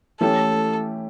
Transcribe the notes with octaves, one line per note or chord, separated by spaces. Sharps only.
E3 A3 C#4 G4 A4